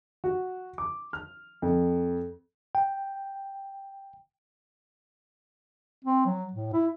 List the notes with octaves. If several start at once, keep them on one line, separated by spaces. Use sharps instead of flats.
F#4
D6
F6
F2
G5
C4
F#3
A2
E4